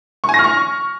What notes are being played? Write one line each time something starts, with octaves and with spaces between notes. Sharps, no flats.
C#6
G#5
A#6
F6
C#6